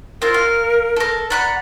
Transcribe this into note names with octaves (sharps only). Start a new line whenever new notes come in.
C4 F4 A#4
F5
A4 A#4
D5 F#5 A#5 B5